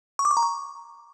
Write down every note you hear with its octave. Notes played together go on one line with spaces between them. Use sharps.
C#6
D6
C#6
A#5
C#6